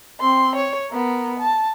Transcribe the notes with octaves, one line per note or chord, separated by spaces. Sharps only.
C4 C6
C#5
B3 A#4
A5